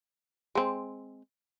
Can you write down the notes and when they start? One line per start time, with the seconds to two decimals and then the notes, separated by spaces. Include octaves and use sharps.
0.55 G#3 C4